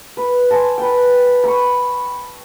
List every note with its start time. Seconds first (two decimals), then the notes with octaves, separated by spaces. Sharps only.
0.17 B4
0.51 C5 G#5 A5
0.78 B4 G5
1.44 B5 C#6